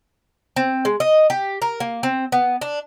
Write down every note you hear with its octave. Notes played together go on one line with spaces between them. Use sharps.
C4
G#3
D#5
G4
A#4
A#3
C4
B3
D4